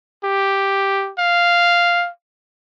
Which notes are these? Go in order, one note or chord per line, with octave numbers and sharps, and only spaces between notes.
G4
F5